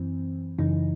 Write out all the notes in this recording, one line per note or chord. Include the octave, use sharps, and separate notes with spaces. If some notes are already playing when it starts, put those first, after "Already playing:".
Already playing: F#2 E3 C4
F#2 C#3 E3 D#4